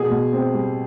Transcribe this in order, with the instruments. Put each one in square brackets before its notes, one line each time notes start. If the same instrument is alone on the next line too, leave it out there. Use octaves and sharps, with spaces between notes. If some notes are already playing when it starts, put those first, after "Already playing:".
Already playing: [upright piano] B2 [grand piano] G#4
[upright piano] B2
C4
G3